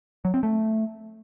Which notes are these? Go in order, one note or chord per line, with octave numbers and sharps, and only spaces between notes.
F#3
C4
A3